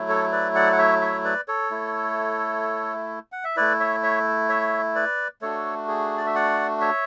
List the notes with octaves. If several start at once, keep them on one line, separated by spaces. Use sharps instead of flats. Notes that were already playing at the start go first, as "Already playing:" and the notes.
Already playing: F#3 A3 E4
A4 C#5
B4 D5
D5 F#5
F#5
C#5 E5
C#5 E5
B4 D5
A4 C#5
A3 E4
F#5
E5
A3 E4 B4 D5
C#5 E5
C#5 E5
C#5 E5
B4 D5
A3 D4 F#4 A4 C#5
G#4
D5
E5
D5 F#5
C#5 E5